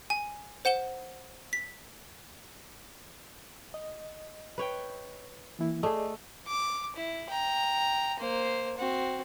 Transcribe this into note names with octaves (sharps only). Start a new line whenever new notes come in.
G#5
C5 F#5 E7 G7
B6
D#5
B4 C#5 G5
E3 A#3 E4
A3 G#4 D5 D#5
D6
E4
G5 A#5
A#3 C5
C4 F#4